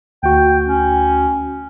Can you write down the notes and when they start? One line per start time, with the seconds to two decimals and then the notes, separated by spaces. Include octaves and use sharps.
0.23 D2 F#4 G5
0.67 C#4